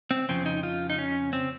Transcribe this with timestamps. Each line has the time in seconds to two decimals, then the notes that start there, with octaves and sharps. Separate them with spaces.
0.11 C4
0.29 F2 C#3 F3 C4
0.46 D#4
0.63 F4
0.90 D#4
0.98 C#4
1.33 C4